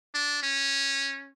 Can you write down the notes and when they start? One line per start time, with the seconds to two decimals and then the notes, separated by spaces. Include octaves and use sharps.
0.15 D4
0.43 C#4